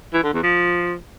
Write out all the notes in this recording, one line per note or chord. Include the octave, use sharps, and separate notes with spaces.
E3
D3
E2
F3